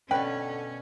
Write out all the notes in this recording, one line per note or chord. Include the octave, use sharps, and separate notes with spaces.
B2 D3 C#4 B4 G5